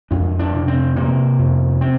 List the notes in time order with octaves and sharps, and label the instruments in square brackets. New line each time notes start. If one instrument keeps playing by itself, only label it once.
[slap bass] F2 D4
D4
C3
C4
C3 A#3
F2
C4